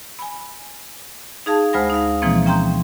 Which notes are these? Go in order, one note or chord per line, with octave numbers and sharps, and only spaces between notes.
G#5 B5
D#4 G#4 F5 A5
D2 G#3 C5 G#5 B5 A#6
D#4 F5
B2 E3 F3 G#3 A#3 C4
C#4 G5 A#5 C6 G6